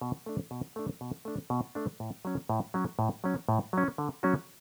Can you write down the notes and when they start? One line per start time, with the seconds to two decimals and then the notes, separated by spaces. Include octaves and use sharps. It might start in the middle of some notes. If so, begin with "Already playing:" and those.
0.01 B2
0.26 A3 D4
0.51 B2
0.76 A3 D4
1.01 B2
1.25 A3 D4
1.50 B2
1.75 A3 D4
2.00 A2
2.25 F#3 C#4
2.49 A2
2.74 F#3 C#4
2.99 A2
3.24 F#3 C#4
3.49 A2
3.73 F#3 C#4
3.98 D3
4.23 F#3 C#4 F#4